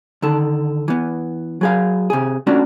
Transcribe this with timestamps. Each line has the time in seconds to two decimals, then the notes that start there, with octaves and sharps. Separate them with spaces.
0.22 D3 D#3 A4
0.88 E3 B3
1.61 F#3 G#4 F5
2.10 C3 G#4
2.47 A3 C#4 D4 F#4